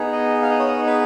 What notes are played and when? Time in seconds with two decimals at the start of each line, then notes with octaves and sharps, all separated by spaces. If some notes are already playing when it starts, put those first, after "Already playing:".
Already playing: B3 D#4 G#4
0.12 D#5
0.42 F5
0.50 D#5
0.59 C#5
0.67 D#5
0.86 B4